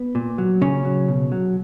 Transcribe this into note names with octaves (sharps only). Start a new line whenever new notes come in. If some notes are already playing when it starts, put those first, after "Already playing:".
Already playing: B3
A#2
F#3
A#2 C#3 C#4
F#3
B2
F#3